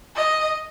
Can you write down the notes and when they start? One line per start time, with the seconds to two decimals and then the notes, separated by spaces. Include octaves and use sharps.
0.16 D#5